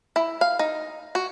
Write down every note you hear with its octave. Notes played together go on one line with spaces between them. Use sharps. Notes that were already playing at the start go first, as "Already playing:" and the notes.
E4
F5
D#4
F#4